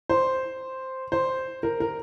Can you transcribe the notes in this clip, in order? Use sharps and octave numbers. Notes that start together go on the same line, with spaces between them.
C5
C5
A#4
A#4